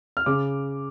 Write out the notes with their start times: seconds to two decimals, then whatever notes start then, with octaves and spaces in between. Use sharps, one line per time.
0.17 F6
0.26 C#3 D6